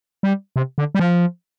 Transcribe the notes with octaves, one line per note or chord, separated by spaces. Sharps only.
G3
C3
D3
G3
F3